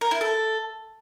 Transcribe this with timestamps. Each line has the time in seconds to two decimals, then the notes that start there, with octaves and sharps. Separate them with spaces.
0.01 A#4
0.11 E4
0.21 A4